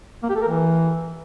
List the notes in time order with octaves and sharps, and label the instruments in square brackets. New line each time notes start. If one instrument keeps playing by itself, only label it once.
[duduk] A#3
G4
A4
A#4
E3